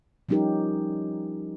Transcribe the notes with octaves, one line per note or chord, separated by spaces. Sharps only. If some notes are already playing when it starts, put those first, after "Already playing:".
F3 G3 C#4 D#4 G4 A#4